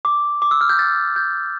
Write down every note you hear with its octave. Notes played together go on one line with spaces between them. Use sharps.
D6
D6
E6
F6
G6
A6
G6